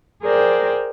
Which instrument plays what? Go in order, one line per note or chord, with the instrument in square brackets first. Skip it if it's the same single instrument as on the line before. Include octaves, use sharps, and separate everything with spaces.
[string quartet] G#4 A#4 C5 D5 G5